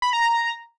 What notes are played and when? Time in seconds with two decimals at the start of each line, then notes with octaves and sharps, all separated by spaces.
0.02 B5
0.13 A#5